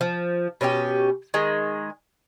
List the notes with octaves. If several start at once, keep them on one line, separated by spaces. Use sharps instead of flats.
F3
B2 C#4 D#4 G4
D#3 G#3